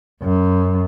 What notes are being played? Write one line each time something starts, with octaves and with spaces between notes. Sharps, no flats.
F#2